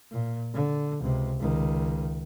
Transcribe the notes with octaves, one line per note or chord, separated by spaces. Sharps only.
A#2
D3
C#2 C3
C#2 D#3